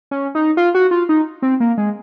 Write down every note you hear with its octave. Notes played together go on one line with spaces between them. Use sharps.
C#4
D#4
F4
F#4
F4
D#4
C4
A#3
G#3